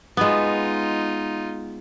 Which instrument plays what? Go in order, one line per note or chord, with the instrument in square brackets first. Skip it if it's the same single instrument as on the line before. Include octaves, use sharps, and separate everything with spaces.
[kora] G#3 B3 [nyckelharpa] D#4 F4